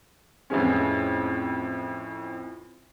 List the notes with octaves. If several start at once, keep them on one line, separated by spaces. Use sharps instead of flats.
F2 A2 E3 G#3 C#4